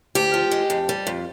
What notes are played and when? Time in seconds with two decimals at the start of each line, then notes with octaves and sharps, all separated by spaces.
0.15 D2 G4
0.34 F3
0.51 G#3
0.70 F2
0.89 G3
1.07 F2